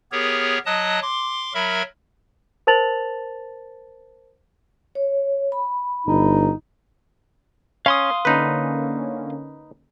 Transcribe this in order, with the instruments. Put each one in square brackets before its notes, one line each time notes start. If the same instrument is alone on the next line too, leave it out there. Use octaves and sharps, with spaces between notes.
[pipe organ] B3 G4 G#4 A#4 C#5
F#3 D#5 A5 D#6 F#6
C6 D6
F#3 A#4 E5 B5
[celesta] A#4 C5 A5 A6 F7 F#7
[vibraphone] C#5
B5
[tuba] G1 [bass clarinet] D#4
[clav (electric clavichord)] C#4 [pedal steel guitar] F5 C6 D#6
[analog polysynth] D3 A#3 C#4 [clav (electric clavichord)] D#4 B4